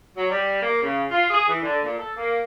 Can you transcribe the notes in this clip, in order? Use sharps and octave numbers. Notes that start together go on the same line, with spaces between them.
F#3
G3
A#3
C#3
F4
G#4
E3
D3
A#2
A4
A#3